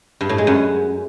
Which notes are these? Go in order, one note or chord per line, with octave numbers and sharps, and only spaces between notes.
G2
A2
G#3
F#2